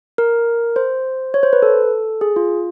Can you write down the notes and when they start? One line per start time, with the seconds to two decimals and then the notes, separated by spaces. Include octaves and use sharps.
0.18 A#4
0.76 C5
1.34 C#5
1.43 C5
1.53 B4
1.62 A4
2.21 G#4
2.36 F4